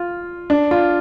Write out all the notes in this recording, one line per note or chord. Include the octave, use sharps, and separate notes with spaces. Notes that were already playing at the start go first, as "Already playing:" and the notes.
Already playing: F4
D4
F4